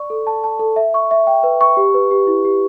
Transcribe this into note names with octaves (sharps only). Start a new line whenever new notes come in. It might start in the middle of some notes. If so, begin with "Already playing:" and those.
Already playing: D5 C#6
A4
A5
A5
A4
E5
C#6
E5
G5
B4
C#6
G4
B4
G4
E4
G4